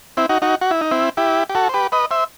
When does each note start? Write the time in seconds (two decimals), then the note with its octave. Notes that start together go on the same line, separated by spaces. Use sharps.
0.17 C4 E4
0.29 D#4 F#4
0.42 D#4 F#4
0.61 F#4
0.71 E4
0.81 D#4
0.91 C4 E4
1.17 E4 G4
1.50 G4
1.55 F#4 A4
1.69 C5
1.74 G4 B4
1.92 B4 D#5
2.11 C5 E5